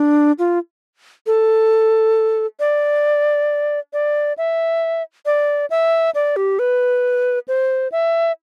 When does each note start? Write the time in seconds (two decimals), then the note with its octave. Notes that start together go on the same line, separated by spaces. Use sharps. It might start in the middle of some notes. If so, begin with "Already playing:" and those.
Already playing: D4
0.39 F4
1.27 A4
2.60 D5
3.93 D5
4.38 E5
5.26 D5
5.70 E5
6.15 D5
6.36 G4
6.59 B4
7.48 C5
7.92 E5